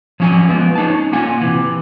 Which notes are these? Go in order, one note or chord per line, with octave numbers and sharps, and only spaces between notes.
F3 F#3 C#4 F5 G#5
F3 G#3 A#3 B3
C#4 D#4 A5
C#4
A#3 F4 F#5 G#5
C3 E3